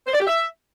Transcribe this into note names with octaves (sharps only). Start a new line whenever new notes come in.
C5
D5
G4
E5